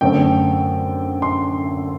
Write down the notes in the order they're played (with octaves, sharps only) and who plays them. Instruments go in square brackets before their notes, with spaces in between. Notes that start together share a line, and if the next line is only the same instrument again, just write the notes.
[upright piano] F#2 D3 A3 C4 G5
C6